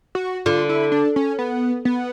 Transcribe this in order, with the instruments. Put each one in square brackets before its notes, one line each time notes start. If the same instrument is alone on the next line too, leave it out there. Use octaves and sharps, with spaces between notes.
[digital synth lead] F#4
[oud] D3 [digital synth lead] F4
[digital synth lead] E4
D4
C#4
B3
B3